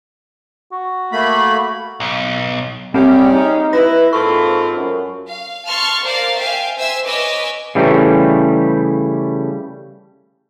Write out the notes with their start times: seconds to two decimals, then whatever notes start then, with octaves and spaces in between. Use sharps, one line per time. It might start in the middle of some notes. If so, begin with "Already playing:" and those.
0.72 F#4
1.12 A3 A#3 B5
2.00 B1
2.94 G3 G#3 A#3 C4 C#4 G4
3.32 D#4
3.73 E4 B4 A#6
4.13 G#2 A#3 C4 F4 A4 B5 C#6
4.75 F#2
5.28 F5
5.68 A5 C6 C#6 F6 A6
6.04 A#4 C5 D5 F5 A6
6.38 E5 F5 G5 G#5
6.76 C5 E5 G#5 E6
7.05 B4 C#5 D#5 G#5 D6 E6
7.75 C#3 E3 G3 A3